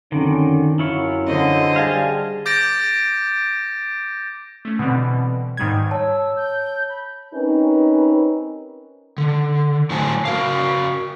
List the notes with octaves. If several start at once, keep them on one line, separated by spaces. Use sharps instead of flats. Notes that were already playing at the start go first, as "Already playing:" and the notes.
F#2 D3 D#3 C4 C#4
F#2 E4 F4 C#5
D3 C5 D#5
G3 G#4 F5 G#5 A5
D6 G6 A6 A#6 D7
A3 C#4
B2 D3 E3 G3 C4
G#2 D#3 G3 G6 G#6
C#5 A5 E6
G6
B5
C4 C#4 D#4 G4 A#4 B4
D3
A2 F#3 F#4 C5 G#5 A5
F#4 A#4 F5